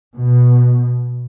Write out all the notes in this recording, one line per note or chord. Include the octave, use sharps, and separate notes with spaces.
B2